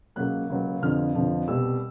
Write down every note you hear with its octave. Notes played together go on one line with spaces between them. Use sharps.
C#2 C#3 F#3 A#3 F#6
C#2 C#3 F#3 A#3
G1 F2 D3 F3 F6
G1 F2 D3 F3
C2 B2 G3 E6